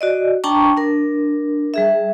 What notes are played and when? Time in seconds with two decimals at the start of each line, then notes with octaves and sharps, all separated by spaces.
0.01 F#4 D5 D#5
0.44 D4 G5 A5 A#5 C#6
0.77 D4 A#4
1.74 G3 G#4 E5